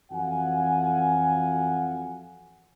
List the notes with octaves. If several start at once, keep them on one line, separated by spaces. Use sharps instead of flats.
F2 E3 F#4 F5 F#5 G#5